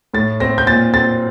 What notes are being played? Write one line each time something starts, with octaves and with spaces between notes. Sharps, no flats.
A2 A6
C4 A#6
G6
A#2 A6
C4 A6